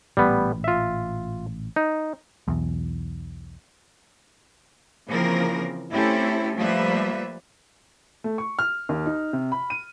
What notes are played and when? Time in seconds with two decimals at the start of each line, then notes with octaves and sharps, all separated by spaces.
0.17 A1 A#2 G3 B3
0.64 F4 E5
1.76 D#4
2.48 B1 E2
5.09 C#3 E3 F3 A#3 C4 A#4
5.93 A3 C4 C#4 E4 G4 A4
6.57 F3 G3 A3 A#3 B4 E5
8.24 A3
8.38 C#6
8.59 F6
8.89 D#2
9.06 D#4
9.33 C3
9.52 B5
9.70 D#7